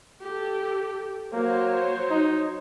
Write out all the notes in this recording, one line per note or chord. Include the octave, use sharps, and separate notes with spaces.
G4 A4
F#3 A#3 C5 C#5
D#4